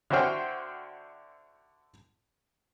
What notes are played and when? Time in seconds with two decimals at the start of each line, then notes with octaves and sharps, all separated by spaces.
0.10 D3 E4 F#4 C5 G5 F6